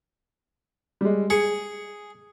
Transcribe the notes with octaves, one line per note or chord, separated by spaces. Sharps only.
G3 G#3
G#4 C#7